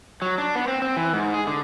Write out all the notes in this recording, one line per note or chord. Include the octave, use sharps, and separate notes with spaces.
F#3
D4
B3
C4
C4
E3
G#2
G#4
D3